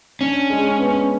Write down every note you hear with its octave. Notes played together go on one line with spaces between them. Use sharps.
C#4 D4
G#3
B3